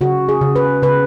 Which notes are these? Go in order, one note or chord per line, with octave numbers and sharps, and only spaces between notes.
C#3 F#4
G#4
C#3
B4
C#3 B4